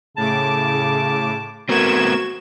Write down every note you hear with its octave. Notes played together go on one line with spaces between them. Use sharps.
A2 C#3 A5 D6
A3 B3 C4 F#4 A#4 G#6 E7